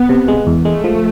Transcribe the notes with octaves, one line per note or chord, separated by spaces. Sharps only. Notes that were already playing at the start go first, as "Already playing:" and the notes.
Already playing: B3
C3
G#3
E2
G#3 A3
F3